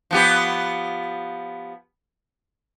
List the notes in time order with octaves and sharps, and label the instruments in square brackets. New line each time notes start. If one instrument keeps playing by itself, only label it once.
[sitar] F3 B3 G4